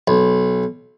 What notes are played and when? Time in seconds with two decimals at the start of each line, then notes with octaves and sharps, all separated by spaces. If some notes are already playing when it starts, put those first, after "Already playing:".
0.08 B1